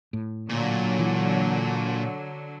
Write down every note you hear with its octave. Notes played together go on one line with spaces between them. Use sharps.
A2
A#2 D3 F#3
E3